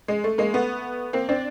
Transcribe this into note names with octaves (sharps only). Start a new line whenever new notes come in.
G#3
A3
G#3 A#3
A3 B3
A#3 C4
C4 D4